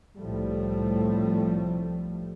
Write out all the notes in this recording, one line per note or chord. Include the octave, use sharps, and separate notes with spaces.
C2 A2 F3 G3 A3